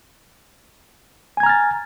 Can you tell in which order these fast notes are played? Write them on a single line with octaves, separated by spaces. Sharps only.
G#5 G#6 A#5 F6 A6